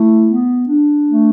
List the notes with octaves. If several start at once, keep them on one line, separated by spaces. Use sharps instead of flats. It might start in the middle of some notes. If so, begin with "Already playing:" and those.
Already playing: A3 E4
B3
D4
A3